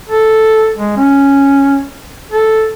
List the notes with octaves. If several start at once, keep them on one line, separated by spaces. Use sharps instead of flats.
A4
G#3
C#4
A4